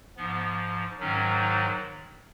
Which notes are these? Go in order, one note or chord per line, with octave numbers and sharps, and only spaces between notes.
G#2 F3 B3
G#2 D#3 F#3 C#4
D#4